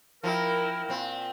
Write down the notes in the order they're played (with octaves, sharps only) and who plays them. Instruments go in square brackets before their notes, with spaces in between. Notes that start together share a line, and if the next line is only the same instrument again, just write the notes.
[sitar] F3 [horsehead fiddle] E4 G5 [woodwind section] A#4
[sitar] A#2 C4